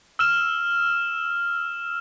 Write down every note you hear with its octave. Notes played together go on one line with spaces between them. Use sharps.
E6 F6 E7